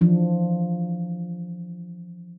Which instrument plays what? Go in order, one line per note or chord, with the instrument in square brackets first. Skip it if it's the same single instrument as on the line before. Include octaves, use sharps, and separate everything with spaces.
[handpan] E3 F3 D4